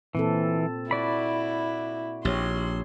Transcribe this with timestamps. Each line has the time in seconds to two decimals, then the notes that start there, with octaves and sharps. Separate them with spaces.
0.15 A#2 E3 C4 A4
0.91 E4 F#4 D5 B5
2.25 A#1 G4 C#5 C6